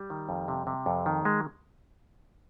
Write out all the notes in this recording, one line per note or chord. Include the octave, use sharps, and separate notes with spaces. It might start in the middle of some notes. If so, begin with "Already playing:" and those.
Already playing: G3
D#3
F2
C3
C3
F2
D#3
G#3